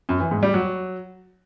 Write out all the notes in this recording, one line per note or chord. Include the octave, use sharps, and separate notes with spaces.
F#2
E3
G#2
G3
F#3